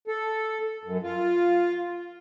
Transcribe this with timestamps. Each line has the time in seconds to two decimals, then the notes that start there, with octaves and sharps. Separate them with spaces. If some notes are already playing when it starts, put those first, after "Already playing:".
0.08 A4
0.84 F#2
1.03 F4